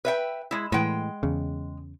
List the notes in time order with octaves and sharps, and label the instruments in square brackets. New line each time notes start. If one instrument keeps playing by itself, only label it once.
[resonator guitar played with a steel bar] B4 E5 G5
G#3 E4
[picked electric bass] A2 E3 [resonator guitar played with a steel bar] G#3 G5
[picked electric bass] E2 C#3